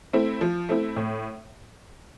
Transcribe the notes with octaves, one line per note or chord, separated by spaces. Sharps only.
A3 C4 E4
F3
A3 C4 E4
A2